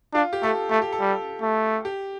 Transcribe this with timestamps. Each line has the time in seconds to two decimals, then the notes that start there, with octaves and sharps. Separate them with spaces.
0.14 D4 F4
0.33 G4
0.42 A3 A4
0.70 A3 A4
0.82 G4
0.92 A4
1.00 G3
1.42 A3
1.85 G4